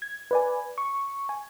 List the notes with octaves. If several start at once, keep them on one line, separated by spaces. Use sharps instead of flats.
G#6
B4 D5 G#5
C#6
G#5